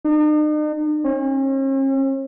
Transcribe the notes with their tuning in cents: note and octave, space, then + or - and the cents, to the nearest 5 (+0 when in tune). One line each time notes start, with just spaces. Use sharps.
D#4 -45
C#4 -45